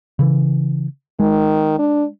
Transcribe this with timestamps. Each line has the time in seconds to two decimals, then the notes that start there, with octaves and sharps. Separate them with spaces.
0.19 C#3 E3
1.20 D#3 G#3
1.79 D4